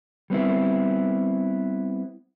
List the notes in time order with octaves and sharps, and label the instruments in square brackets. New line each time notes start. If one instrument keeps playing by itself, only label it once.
[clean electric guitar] G3 B3 C4 E4